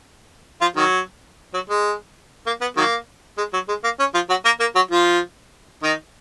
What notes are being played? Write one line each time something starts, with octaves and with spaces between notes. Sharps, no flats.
F3 F4
D#3 F#3
F#3
G#3
A#3
B3
D#3 F#3 A#3
G#3
F#3
G#3
A#3
C#4
F3 F4
F#3 F#4
A#3 A#4
A#3 A#4
F#3 F#4
F3 F4
D#3 D#4